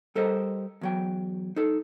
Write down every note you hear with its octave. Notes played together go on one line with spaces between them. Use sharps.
G3 A4 A#4 C5 D#5
E2 F#3 G5
D#4 A4